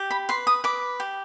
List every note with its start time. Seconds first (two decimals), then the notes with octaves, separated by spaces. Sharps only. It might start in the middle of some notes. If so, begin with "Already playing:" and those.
Already playing: G4
0.11 B5
0.29 B4 C6
0.47 D#6
0.64 B4 D6
1.00 G4